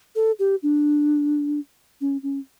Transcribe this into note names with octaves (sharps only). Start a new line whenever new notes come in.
A4
G4
D4
C#4
C#4